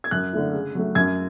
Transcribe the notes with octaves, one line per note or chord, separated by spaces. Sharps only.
G#6
F#2 F#6
D3 A3 E4
C#3
F#3 A3
F#2 G#6